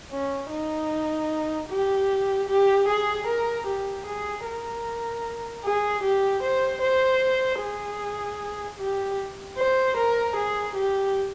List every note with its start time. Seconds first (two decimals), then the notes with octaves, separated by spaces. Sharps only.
0.12 C#4
0.51 D#4
1.69 G4
2.49 G4
2.88 G#4
3.27 A#4
3.67 G4
4.06 G#4
4.45 A#4
5.64 G#4
6.03 G4
6.43 C5
6.81 C5
7.61 G#4
8.79 G4
9.58 C5
9.97 A#4
10.36 G#4
10.76 G4